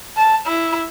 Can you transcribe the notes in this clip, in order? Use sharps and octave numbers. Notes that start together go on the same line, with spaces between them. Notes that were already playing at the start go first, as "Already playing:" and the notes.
A5
E4